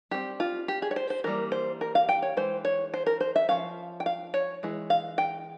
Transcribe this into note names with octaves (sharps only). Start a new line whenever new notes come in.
G3 C4 G4
F4
G4
G#4
C#5
C5
C5
E3 G3 A#3 A#4
C5
A#4
F5
G5
C#5
E3 G#3 C5
C#5
C5
A#4
C5
E5
F3 G#3 C#4 F5
G5
F5
C#5
E3 G#3
F5
G5